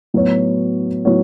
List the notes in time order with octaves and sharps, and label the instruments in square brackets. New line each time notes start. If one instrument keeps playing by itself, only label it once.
[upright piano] A2 F#3 B3 F#4 C#5
A2 F#3 B3 F#4 C#5